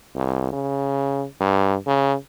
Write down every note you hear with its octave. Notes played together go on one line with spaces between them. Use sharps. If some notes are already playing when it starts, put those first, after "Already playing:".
C2
C#3
G2
C#3